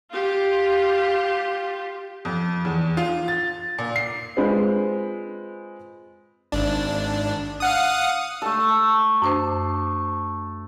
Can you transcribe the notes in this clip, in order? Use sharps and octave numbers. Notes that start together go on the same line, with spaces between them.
F4 G4
F2
E2
F4
A6
A#2
C7
G#3 C4 F4 B4 C5
G#1 D4
F5 F#5 D#6
A3 A4 A5
F#2 D4 C5